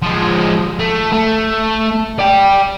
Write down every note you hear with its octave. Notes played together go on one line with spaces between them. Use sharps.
F3 G#3
A3
A3
D5 G5